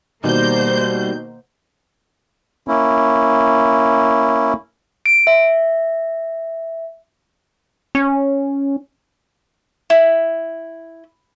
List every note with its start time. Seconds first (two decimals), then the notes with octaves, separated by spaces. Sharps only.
0.24 B2 D#3 G3 A#3 C5 G6
2.68 A#3 C#4 E4
5.06 D7
5.27 E5
7.95 C#4
9.90 E4